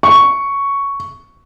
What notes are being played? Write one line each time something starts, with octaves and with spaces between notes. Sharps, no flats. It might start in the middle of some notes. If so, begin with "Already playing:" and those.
C#6